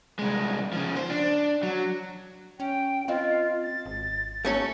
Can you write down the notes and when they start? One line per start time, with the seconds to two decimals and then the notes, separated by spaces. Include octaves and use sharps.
0.19 C2 G#3
0.73 C#3 F3
0.97 C5
1.10 D4
1.63 F#3
2.60 C#4 G5
3.08 C4 F4 D#5 F5
3.60 A6
3.86 G#1
4.45 A3 C#4 A4